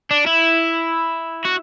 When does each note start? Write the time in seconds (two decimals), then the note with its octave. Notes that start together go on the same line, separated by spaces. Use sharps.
0.11 D4
0.26 E4
1.45 F#4